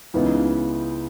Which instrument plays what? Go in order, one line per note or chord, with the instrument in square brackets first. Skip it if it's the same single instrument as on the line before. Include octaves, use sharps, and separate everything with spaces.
[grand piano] C#2 C#3 E3 B3 D#4